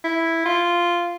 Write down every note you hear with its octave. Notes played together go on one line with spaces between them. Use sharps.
E4
F4